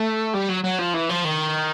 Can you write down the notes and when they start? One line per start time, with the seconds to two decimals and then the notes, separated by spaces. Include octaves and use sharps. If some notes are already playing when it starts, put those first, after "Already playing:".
Already playing: A3
0.35 G3
0.50 F#3
0.64 F#3
0.79 F3
0.94 E3
1.09 F3
1.24 D#3